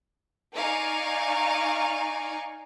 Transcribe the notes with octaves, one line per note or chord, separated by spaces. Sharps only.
D#4 D5 F5 G#5 C#6